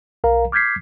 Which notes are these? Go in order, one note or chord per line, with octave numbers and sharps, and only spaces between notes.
B1 A#4 F5 A#5
D6 F6 G6 G#6 B6 C7